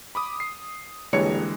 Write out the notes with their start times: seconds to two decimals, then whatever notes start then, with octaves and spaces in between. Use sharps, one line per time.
0.15 B5 D6 D#6
0.40 C7
1.13 D#1 D3 E3 G#3 C#5 C#7